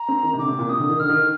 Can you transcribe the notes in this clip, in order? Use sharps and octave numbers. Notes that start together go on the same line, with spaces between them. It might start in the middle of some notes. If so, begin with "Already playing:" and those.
Already playing: A#5
C4
D#3
C3
D3 D6
C3
A#2
C3 D#6
D3
D#3
D3 F6
D#3